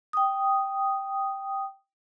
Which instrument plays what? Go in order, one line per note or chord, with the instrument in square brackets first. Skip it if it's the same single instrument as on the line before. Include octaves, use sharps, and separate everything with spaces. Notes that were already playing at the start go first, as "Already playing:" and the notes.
[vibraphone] G5 D#6